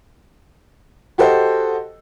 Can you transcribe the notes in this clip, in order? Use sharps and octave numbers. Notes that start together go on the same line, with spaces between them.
F#4 G4 A4 C5 D#5